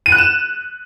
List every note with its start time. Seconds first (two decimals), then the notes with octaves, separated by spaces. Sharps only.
0.06 D#7
0.12 F#6
0.18 E7